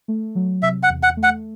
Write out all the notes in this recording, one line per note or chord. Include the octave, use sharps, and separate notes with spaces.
A3
F#3
C3 E5
F#5
E2
F#5
A3
F#5